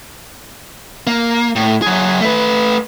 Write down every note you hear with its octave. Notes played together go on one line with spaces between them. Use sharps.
A#3
A2
F#3 G#4
A3 B4